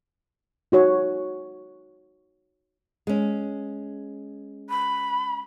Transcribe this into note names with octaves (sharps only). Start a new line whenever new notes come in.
D#4 F#4 C#5
G#3 C#4
B5